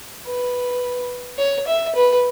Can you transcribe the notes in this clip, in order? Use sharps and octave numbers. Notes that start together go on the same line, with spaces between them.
B4
C#5
E5
B4